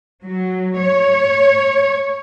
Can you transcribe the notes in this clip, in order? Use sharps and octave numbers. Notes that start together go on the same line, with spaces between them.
F#3
C#5